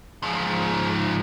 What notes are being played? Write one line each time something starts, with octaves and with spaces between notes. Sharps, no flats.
G#2 F3